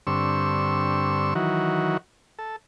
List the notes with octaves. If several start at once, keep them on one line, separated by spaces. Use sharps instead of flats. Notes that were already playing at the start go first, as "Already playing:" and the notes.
G2 D3 C4 C#6 E6
D#3 E3 F#3 F#4
A4